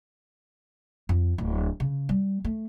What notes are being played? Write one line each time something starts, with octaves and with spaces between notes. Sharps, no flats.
F2
D1
C#3
G3
A3